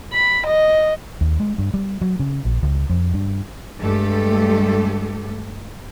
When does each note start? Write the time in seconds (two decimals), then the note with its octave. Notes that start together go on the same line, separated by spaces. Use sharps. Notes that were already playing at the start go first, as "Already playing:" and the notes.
0.12 B5
0.47 D#5
1.21 D#2
1.40 G#3
1.58 G2
1.74 G3
2.01 F#3
2.19 C#3
2.45 A#1
2.63 C#2
2.90 F2
3.14 G2
3.80 G2 G#3 A3 G4 A4